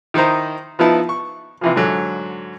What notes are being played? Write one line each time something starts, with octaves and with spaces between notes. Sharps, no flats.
D#3 D#4 E4 C5 A#5
F3 B3 D#4 E4 A5
C#6
C3 E3 F3
G#2 D3 F#3